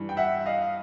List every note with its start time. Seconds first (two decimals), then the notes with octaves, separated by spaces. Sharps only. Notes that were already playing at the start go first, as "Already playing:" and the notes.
Already playing: G2 E3
0.09 G5
0.17 E5 F#5
0.46 D#5 F5